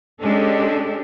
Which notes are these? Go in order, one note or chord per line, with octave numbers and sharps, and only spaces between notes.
G#3 C#4 D4 G4 A4